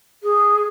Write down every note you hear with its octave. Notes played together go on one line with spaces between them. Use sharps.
G#4